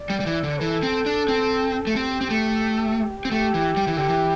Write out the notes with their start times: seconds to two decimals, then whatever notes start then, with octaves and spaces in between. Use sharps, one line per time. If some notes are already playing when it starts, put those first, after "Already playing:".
Already playing: D5
0.10 G3
0.20 G3
0.26 E3
0.43 D3
0.61 E3 A4
0.83 C4
1.06 D4
1.28 C4
1.87 A3
1.96 C4 G4
2.21 C4
2.30 A3
3.25 C4
3.31 A3 G4
3.54 E3
3.77 G3
3.87 E3
3.97 D3 G4
4.07 E3